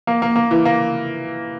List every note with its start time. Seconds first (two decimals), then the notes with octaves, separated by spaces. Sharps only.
0.07 A#3
0.22 A#3
0.36 A#3
0.51 E3
0.65 A#3